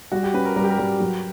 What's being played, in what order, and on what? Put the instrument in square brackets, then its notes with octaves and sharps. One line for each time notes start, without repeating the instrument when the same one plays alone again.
[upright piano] G3 [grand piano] F#4
[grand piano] G4
[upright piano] C#4 [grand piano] B4
[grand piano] A#4
[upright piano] G3 [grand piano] A#4
[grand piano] G4
A#4
[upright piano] G3
F#3